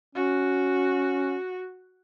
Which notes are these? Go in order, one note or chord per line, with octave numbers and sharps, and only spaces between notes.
C#4 F#4